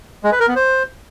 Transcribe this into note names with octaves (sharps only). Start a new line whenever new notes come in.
G#3
B4
A#4
B3
C5